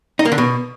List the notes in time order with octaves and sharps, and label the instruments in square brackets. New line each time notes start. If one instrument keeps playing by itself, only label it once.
[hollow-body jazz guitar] D#4
A#3
D3
B2